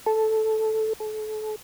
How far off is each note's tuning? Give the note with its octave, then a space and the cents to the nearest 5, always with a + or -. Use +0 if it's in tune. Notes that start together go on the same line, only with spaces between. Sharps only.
A4 -5
A4 -35